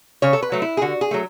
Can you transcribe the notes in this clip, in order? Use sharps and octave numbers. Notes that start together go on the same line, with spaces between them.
C#3 C#5
A4
B4
F#3 A3
E4
G#4
D3 F#4
G#4
F#3 A3